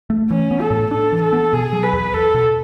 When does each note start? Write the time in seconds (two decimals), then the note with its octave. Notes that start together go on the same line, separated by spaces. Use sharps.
0.10 A3
0.30 E3 C#4
0.51 B3
0.61 A4
0.71 A2
0.91 D4 A4
1.12 E3
1.22 A4
1.33 B3
1.53 B2 G#4
1.73 F#3
1.83 B4
1.93 E2
2.13 E2 A4
2.34 B2